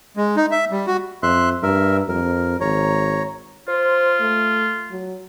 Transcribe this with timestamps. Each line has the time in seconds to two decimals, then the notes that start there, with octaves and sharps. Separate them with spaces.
0.17 G#3
0.37 D#4
0.51 E5
0.71 G3
0.87 F#4
1.23 F2 E5 C6 F#6
1.63 G2 A#4 E5
2.08 F2 A#4
2.60 G#1 C#5 A#5
3.68 F4 C5
4.21 A3
4.91 F#3